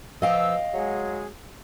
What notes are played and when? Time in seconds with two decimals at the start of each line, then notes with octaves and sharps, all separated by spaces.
0.22 B2 F3 D#5 F5 G5 E6
0.73 F#3 G#3 G#4